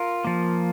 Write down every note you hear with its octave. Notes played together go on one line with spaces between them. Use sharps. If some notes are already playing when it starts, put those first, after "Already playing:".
Already playing: F4 A#4
F3 A#3